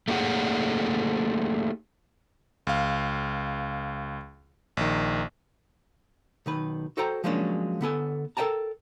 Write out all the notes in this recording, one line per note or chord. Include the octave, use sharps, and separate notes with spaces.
A3 A#3 D#4 G4 G#4 F#5
C#2 F5
A#1 D#3
B1 D#3 B4
F#4 A4 C5 G5 A#5
F3 F#3 G#3 A#3 C#4 D4
D3 B3 A4 G#5
A4 A#4 D#5 G5 A5 A#5